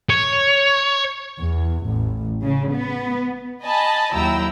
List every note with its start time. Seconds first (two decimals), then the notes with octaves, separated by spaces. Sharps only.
0.10 C#5
1.38 E2
1.86 A1
2.44 C#3
2.74 B3
3.63 D#5 G#5 A5 B5
4.14 D#2 F#3 E4 G5 A#5 E6